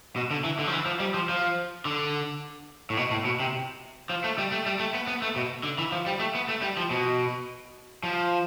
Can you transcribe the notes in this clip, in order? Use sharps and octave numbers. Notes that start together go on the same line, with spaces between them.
B2
D3
E3
D3
F3
E3
F3
G3
F3
F3
D3
A2
B2
A2
B2
C3
F3
A3
G3
A3
G3
A3
B3
B3
A3
B2
D3
E3
F3
G3
A3
B3
A3
G3
F3
B2
F3